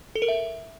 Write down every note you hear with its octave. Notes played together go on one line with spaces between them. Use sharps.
A4
A#4
E5